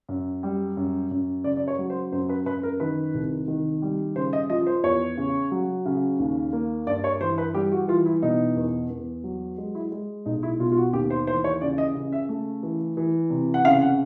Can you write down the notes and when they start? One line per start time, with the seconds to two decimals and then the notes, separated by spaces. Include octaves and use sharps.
0.09 F#2
0.43 G3
0.77 F#2
1.11 F#2
1.44 C#3 D5
1.57 D5
1.68 C#5
1.78 F#3
1.90 C5
2.12 F#2 C5
2.29 B4
2.46 F#2 B4
2.63 A#4
2.80 D#3 B4
3.14 C2
3.48 D#3
3.82 G3
4.16 C#3 C5
4.33 D#5
4.50 F3 D#5
4.66 C5
4.83 E2 C#5
5.17 C#3
5.51 F#3
5.86 C#3
6.19 D#2
6.53 A#3
6.87 G2 D5
7.04 C#5
7.21 E3 C5
7.38 B4
7.54 G3 G4
7.72 F#4
7.88 E3 F4
8.06 E4
8.23 B2 D#4
8.56 E2
8.90 E2
9.24 F#3
9.58 G#3
9.75 E4
9.92 G#3
10.26 B1 D#4
10.43 E4
10.60 B2 F4
10.72 F4
10.77 F#4
10.93 D#2 G4
11.10 C5
11.27 E3 C5
11.44 C#5
11.61 C#3 D5
11.78 D#5
11.95 C#3
12.12 E5
12.29 A3
12.63 E3
12.97 E3
13.30 C3
13.54 F#5
13.65 C#3 F5
13.82 F#5